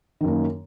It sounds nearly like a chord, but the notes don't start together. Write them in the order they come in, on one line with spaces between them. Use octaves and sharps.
D#3 F#2 A#3